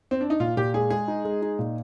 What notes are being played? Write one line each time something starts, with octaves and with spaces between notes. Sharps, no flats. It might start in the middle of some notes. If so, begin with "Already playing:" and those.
C4
D4
D#4
A#2 F4
A#2 G4
G#3 G#4
G#3 G#4
D#4
G#3
D#4
A#2